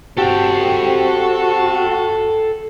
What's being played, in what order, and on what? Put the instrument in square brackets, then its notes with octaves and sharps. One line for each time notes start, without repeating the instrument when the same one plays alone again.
[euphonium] C4 [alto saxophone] F#4 [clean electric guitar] G4 [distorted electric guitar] A4 G5